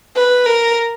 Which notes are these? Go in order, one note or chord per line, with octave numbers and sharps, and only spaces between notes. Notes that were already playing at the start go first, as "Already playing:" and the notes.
B4
A#4